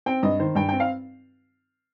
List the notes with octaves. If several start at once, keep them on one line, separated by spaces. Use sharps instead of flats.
C4 G5
G2 D#5
D#3 C5
G2 G5
C4 G5
F5